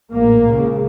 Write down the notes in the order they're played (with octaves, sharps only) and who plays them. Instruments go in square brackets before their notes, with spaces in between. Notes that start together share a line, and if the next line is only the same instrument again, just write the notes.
[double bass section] A#1 A2 A#3
C#2 C#3